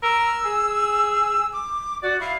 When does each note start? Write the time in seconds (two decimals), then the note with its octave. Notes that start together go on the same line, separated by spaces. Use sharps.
0.03 A#4 E6
0.45 G#4
1.53 D6
2.03 F#4 D5
2.21 E4 F5